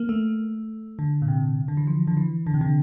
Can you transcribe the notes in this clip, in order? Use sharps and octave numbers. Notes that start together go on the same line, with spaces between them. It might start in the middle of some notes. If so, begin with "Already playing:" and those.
Already playing: A#3
A3
D3
A#2
C3
D3
E3
F3
D3
E3
D3
C3
D3